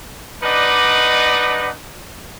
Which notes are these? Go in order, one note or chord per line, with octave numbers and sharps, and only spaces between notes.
D4 D#4 B4 D5 D#5 F#5